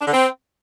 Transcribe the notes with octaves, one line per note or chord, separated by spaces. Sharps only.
D4
D3
C4